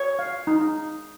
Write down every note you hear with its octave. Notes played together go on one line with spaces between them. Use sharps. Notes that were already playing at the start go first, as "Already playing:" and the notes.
Already playing: C#5
F5
D#4